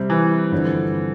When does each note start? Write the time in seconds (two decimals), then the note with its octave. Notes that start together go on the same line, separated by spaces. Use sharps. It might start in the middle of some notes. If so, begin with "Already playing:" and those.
Already playing: C3 G3 C4
0.10 E3
0.52 G2 D3 F3 C4